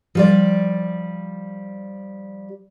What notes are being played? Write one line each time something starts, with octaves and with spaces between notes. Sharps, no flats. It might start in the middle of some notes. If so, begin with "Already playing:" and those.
F3 G3 D5